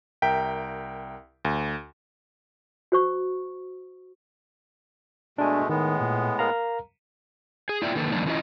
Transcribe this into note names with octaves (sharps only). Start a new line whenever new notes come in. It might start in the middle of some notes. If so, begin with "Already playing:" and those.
C2 A#4 E5 G5 B6
D2
F#4 C5 C#6
B2 G#3 A3 D4 G#5
A2 D#3 G#3 B3
A#2
A#4 F5 A#5
G#4
A#3 E4 F4 D5 E5 G5
D3 D#3 A#3 A4 B4
D#3 F3 G3 A#3 D4 D#4
E3 A3 C#4 E4 F4 D#5